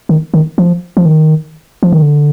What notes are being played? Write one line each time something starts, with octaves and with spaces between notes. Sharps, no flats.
D#3
D#3
F3
F3
D#3
F3
D#3
D3